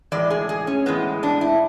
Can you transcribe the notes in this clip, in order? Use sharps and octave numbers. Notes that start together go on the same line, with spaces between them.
A2 E3 G#3 D5
G#4
G#4
C#4
A2 E3 G#3 B3
D4
E4